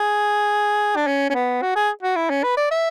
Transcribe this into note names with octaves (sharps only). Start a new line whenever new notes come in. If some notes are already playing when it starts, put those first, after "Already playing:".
Already playing: G#4
D4
C#4
C#4
B3
F#4
G#4
F#4
E4
C#4
B4
D5
E5